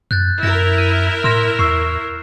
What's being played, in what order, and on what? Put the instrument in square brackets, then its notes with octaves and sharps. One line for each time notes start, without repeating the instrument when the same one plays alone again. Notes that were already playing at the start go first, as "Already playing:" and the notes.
[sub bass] F#2 [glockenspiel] F#6 G6 A6
[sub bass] F#2 [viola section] E4 A#4 [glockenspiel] A#6
[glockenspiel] F6 [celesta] D#7
[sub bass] A2 [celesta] C6 A#6 [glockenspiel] F6 E7
[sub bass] E2 [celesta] C#6 E6 [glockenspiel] C7